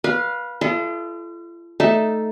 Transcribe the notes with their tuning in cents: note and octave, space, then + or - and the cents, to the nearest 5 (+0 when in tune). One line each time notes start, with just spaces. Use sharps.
B4 -20 F5 +10
F4 -45 A4 -30 D#5 +15
A3 +0 D#4 +0 E5 +0